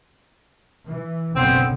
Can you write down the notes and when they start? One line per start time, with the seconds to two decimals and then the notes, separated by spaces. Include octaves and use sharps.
0.86 E3
1.35 F#1 B1 D3 B3 C4